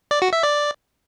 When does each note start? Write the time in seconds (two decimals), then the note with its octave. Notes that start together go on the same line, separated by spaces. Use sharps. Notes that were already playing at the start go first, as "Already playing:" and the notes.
0.11 D5
0.22 F#4
0.33 E5
0.43 D5